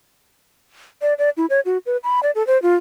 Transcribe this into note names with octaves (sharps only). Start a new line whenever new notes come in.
D5
D5
E4
C#5
F#4
B4
B5
D5
A4
C5
F4